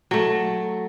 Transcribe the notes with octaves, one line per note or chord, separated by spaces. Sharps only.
F#3 A3